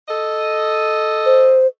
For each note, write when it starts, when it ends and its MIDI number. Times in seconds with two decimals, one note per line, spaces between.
0.08 1.66 69
0.08 1.66 75
1.26 1.67 72